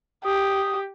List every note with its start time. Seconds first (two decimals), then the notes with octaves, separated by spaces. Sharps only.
0.25 G4 D#6